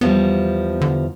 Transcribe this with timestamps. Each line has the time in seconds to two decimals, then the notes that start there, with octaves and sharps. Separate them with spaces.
0.01 E2 F3 G3 B3
0.81 D3